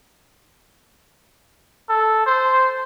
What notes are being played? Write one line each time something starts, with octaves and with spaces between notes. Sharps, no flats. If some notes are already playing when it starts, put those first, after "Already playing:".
A4
C5